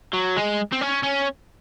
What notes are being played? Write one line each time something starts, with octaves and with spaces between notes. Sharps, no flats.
F#3
G#3
C4
C#4
C#4